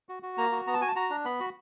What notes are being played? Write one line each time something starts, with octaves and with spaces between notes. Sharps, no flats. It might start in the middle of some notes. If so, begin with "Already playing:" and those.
F#4
F#4
A#3 A#5
F#4
B3 A#5
A5
F#4 G#5
A5
F#4 A#5
D4
B3 B5
F#4